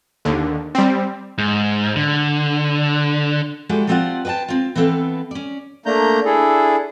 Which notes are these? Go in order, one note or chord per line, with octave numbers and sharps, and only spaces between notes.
D#2 D3
G3 C4
G#2
D3
G3 G#3 E4 F#4 G4 A4
F3 G3 C4 F4 D5 F#5
B4 C5 D5 G5 A5
C4 F4
E3 B3 C4 A4 F5
C#4 D5
A3 A#3 D4 A#5 G6
D4 E4 G#4 A4